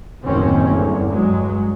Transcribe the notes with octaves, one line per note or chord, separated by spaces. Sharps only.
F#1 D#2 A2 D#3 C4 C#4
E2 G2 D3
G2 F#3 G#3